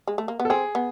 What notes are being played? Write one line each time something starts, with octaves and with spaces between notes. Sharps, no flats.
G#3
A3
A#3
B3
A4
C4 G#4
B3